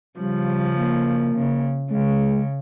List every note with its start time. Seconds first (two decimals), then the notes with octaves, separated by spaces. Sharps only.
0.20 C#3 F3 G3
0.77 A#3
1.35 C#3
1.91 C#3 G#3